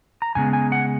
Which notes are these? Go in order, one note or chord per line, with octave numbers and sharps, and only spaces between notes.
A#5
F2 C#3 G#3 B3 G#5
G#5
F#5